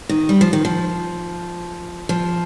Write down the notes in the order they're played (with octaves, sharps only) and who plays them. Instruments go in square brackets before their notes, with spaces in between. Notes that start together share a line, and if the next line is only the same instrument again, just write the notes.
[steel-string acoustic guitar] D#3
G3
F3
D#3
F3
F3